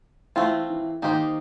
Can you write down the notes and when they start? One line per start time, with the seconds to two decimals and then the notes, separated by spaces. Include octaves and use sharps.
0.36 E3 A3 C4 F4
0.70 E3
1.02 D#3 A#3 D#4 G4 C5 D#5